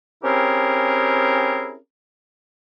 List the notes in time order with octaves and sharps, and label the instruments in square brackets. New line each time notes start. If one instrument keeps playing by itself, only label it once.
[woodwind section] C4 C#4 E4 G4 G#4 A#4